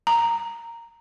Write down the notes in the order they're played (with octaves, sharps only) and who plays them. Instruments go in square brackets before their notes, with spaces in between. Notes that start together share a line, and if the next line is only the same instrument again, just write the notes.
[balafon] A#5